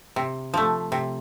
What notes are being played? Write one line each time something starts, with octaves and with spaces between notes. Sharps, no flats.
C3
F3 A3
C3